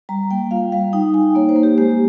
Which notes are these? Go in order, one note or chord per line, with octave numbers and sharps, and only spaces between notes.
G3 A#5
A#3 G5
F4 F5
G3 F5
D#4 G5
D#4 G#5
A#3 C#5
C5
A#3
G4
G#3 G4